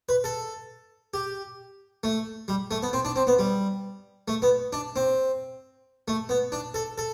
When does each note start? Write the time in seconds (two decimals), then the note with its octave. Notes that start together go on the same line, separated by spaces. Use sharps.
0.09 B4
0.24 A4
1.14 G4
2.04 A3
2.48 G3
2.71 A3
2.83 B3
2.93 C4
3.05 D4
3.16 C4
3.27 B3
3.39 G3
4.28 A3
4.42 B3
4.73 D4
4.96 C4
6.08 A3
6.29 B3
6.52 D4
6.74 A4
6.98 A4